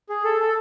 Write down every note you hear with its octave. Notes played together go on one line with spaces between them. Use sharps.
G#4
A4
A4